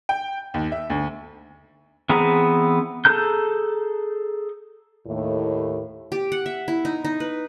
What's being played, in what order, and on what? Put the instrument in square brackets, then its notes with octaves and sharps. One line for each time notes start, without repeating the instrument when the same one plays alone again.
[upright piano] G5
D#2
E5
D2
[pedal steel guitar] E3 B3 C4 G#4 A#5
G#4 A4 A#5 G6
[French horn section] D#2 A2
[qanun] G4
F#5
E5
E4
D#4
D#4
B4